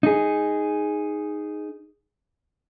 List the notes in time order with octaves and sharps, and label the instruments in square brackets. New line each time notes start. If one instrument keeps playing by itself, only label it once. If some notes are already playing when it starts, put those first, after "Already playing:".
[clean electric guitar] D#4 G#4